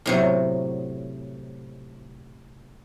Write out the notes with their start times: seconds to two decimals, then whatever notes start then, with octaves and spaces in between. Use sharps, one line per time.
0.06 A2 C3 F#3